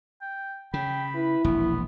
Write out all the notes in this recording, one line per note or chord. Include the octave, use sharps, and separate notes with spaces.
G5
C#3 G5 B5
E4 B4
E1 A#1 B3